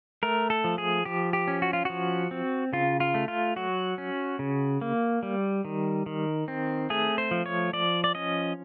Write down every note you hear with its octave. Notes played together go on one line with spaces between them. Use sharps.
A3 A#4
A4
F3
G#4
F3 G4
G4
C#4
F#4
F4
F3 F#4
C4
C#3 F4
F4
A3
F4
F#3 F#4
C#4
C#3
A#3
G3
D#3
D#3
C4
A3 G#4
C5
F3
C#5
F3 D5
D5
C#4 D#5